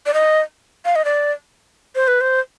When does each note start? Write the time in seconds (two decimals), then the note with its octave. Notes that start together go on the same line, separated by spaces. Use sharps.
0.06 D5
0.14 D#5
0.85 F5
0.96 D#5
1.05 D5
1.95 C5
2.08 B4
2.21 C5